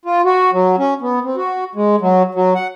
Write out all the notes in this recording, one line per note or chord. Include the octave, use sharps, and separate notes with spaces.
F4
F#4
F#3
C#4
B3
C4
F#4
G#3
F#3
F#3
F#5